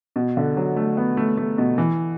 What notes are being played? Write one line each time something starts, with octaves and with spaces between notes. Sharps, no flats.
B2
D3
F#3
A3
B3
A3
A3
B2
E3